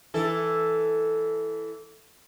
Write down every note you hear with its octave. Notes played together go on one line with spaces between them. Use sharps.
E3 A4